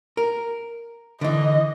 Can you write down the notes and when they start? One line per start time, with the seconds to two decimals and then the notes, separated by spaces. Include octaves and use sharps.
0.17 A#4
1.21 D3 E3 D#5